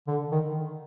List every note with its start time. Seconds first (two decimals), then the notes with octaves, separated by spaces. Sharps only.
0.08 D3
0.32 D#3